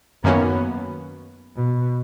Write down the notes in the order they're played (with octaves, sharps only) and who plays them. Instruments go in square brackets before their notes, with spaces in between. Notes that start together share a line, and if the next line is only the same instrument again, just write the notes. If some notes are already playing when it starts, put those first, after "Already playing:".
[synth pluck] F#2 D#3 A#3 C#4 F#4 [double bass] B3
[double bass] B2